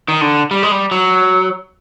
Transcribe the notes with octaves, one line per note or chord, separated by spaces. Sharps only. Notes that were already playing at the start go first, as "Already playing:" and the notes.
D#3
D3
G3
G#3
G3
F#3